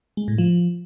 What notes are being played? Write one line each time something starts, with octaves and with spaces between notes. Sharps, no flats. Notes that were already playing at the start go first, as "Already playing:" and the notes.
G#3
A2
F3